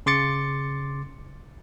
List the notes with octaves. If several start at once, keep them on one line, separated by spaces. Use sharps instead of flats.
C#3 C6 D6 A6 C#7